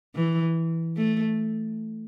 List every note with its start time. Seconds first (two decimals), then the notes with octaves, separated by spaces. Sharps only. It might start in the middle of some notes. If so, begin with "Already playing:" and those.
0.15 E3
0.96 A3